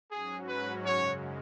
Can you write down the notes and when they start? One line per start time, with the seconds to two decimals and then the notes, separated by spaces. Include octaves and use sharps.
0.10 G#2 F#3 C#4 F#4 G#4
0.48 B4
0.86 F#2 C#3 G#3 C#5